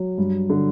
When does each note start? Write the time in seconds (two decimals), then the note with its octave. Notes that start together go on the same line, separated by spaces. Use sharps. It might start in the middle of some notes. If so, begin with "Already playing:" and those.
Already playing: F#3
0.18 G2
0.50 D3